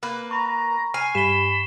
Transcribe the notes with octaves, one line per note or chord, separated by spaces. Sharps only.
A#3 B4
A#5 B5 C#6
G#5 F6 C7
G2 B5 E7 G7